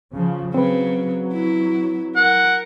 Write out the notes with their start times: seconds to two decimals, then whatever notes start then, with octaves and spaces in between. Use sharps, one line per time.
0.15 C#3 F3
0.54 C#3 F#3 C4 B4
1.33 E4
2.16 A#4 F#5